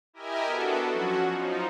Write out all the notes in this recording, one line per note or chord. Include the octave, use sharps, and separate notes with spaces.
E4 G4 A#4 D#5 E5 G#5
B3 D4 F#4 A4
F3 F#3 C#4 F#4
F3 D#4